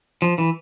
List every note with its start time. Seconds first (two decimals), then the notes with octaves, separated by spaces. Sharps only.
0.22 F3
0.38 E3